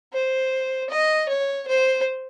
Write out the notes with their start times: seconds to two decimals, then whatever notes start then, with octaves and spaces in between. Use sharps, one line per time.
0.13 C5
0.90 D#5
1.29 C#5
1.68 C5